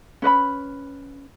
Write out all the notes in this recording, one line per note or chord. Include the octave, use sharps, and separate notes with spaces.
C#4 B4 D#5 B5